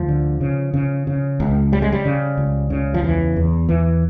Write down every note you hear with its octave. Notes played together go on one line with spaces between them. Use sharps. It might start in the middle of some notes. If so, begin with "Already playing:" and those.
Already playing: D2 F3
D3
C#3
C#3
C#3
C#2
C#3 G3
G#3
G3
C#3
C#2
C#3
F3
E2 E3
E2
E2 E3